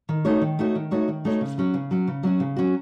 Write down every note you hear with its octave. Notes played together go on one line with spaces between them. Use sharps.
D#3
A3 D#4 F#4 C#5
D#3
A3 D#4 F#4 C#5
D#3
A3 D#4 F#4 C#5
D#3
A3 D#4 F#4 C#5
C#3
F#3 C#4 F#4
C#3
F#3 C#4 F#4
C#3
F#3 C#4 F#4
C#3
F#3 C#4 F#4